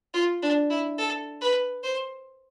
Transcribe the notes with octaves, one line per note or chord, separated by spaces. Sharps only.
F4
D4
E4
A4
B4
C5